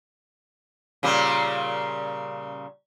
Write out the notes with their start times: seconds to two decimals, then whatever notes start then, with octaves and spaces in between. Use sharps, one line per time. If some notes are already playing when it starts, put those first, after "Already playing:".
1.03 A#2 C#3 G3